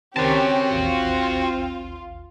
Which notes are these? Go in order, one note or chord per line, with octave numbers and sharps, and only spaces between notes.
C#2 D#3 C4 C#4 F#4 G4 A#4 A5
A1 D#2 F4